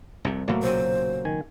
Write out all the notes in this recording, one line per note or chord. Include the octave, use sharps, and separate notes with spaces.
C2 F2 C3
C2 A2 F#3 A3 A#3
B1 A#2 C#3 C5
D#3 G#5